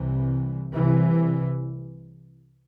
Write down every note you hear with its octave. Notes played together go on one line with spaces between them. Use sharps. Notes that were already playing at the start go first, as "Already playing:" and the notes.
Already playing: C2 C3 E3
C2 C3 E3